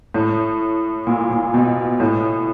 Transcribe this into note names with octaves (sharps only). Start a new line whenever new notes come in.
A2
A#2
A#2
B2
A2